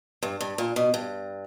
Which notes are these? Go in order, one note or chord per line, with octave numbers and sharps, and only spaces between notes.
G2
G2
A#2
B2
G2